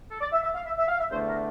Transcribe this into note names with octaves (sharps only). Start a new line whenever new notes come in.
A4
D5
E5
E5
F5
E5
E5
F5
E5
E2 D3 A3 D4 C5
A#4